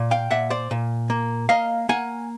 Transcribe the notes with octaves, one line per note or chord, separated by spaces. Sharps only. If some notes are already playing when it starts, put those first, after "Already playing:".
Already playing: A#2
F5 G5
A#2 E5 F#5
C5 D5
A#2
A#3
A#3 D#5 F5
A#3 F#5 G#5